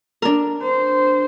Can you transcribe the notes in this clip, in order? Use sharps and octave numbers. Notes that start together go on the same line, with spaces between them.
D4 A#4
C5